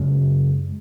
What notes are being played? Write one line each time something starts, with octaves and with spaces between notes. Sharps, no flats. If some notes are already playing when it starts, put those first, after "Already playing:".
Already playing: F#2 C#3 G#3